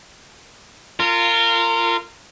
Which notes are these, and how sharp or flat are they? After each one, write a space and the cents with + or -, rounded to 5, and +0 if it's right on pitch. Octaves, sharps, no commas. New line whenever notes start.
F4 -15 A#4 -30